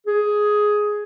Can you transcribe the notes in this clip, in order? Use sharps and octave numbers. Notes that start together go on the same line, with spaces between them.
G#4